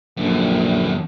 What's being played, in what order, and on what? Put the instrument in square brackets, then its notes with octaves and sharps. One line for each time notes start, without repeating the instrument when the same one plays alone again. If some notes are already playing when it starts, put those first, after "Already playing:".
[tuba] A#1 [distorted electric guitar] F#2 D3